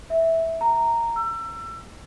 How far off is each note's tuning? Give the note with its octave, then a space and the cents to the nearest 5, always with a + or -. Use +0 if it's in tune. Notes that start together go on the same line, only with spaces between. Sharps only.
E5 -10
A#5 -10
E6 +30